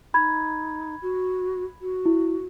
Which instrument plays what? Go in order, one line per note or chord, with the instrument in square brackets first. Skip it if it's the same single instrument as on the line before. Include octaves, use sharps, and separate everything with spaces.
[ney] D#4 [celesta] B5 G#6
[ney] F#4
F#4
[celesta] E4